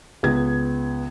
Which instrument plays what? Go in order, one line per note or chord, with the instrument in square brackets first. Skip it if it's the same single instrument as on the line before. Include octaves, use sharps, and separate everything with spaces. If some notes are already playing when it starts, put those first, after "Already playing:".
[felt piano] C#2 B3 G#6